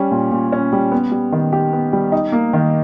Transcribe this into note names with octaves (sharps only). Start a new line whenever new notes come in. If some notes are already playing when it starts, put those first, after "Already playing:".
Already playing: G3 C#4
A#2
A#2
C#4
G3
B3
G3
D#3
G4
B3
G3
D#4
A#3
D#3